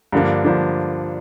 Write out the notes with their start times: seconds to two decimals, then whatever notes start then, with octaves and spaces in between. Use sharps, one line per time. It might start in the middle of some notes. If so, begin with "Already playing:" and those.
0.12 G2 D3 F3 A#3 D4
0.44 G2 D3 F3 A#3 D4